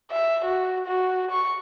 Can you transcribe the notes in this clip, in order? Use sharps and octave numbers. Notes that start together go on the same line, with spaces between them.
E5
F#4
F#4
C#6